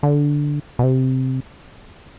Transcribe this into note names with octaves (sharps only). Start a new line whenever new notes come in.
D3
B2
C3